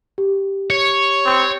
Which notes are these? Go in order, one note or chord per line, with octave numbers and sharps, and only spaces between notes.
G4
C#5
C4